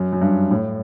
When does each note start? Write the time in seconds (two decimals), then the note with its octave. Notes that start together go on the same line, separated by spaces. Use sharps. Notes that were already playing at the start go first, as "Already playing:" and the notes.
Already playing: F#2
0.13 F#2
0.21 G2
0.51 A2